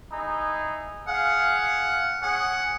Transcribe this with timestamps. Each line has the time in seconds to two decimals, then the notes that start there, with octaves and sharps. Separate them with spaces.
0.12 D#4 E4 G#4
1.08 G#4 F5 F#5
2.22 C#4 G#4 F#5